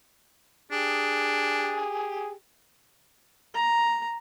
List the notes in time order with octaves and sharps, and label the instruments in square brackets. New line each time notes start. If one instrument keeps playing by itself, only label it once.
[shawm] D4 [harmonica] G4 G#4
[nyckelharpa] A#5